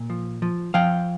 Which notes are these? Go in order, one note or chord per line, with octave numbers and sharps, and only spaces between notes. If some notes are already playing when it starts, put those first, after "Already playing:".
Already playing: A#2
F3
F3
F3 F5 G5